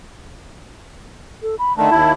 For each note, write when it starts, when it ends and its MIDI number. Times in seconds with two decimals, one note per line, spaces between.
1.43 1.55 69
1.59 1.75 83
1.77 1.90 50
1.77 1.90 51
1.77 1.90 57
1.77 2.10 81
1.91 2.13 39
1.91 2.13 64